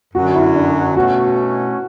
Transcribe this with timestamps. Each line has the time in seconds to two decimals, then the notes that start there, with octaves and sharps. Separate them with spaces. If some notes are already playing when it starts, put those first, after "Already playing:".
0.14 F#2 D3 F#3 F#4
0.35 E4
0.56 D4
0.96 B2 A3 C#4 F#4